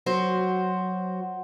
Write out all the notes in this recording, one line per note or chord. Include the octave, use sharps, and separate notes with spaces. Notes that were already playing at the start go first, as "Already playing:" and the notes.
F#3 F#4 C5